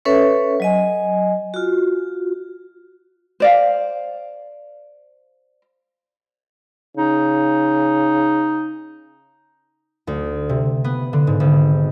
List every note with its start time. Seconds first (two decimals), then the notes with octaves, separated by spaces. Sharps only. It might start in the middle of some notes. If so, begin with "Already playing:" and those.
0.05 C#4 A4 B4 C#5 E5
0.60 F#3 D#5 G#5
1.54 F4 F#4
3.40 C5 D5 F5
6.97 C#3 D#4
10.07 D2
10.49 C3
10.84 B3
11.13 D3
11.27 G#2
11.40 G#1